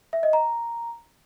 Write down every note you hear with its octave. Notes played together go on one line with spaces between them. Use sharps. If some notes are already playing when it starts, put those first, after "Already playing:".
E5
D#5
A#5